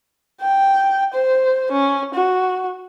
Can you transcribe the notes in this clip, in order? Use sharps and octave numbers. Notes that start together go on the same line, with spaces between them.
G5
C5
C#4
F#4